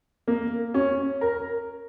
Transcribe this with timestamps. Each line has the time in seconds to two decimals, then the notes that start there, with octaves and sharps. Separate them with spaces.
0.28 A#3
0.74 C#4
1.21 A#4